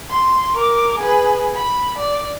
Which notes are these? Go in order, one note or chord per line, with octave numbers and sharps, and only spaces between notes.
C6
A#4 D6
G#4 B4
B5
D5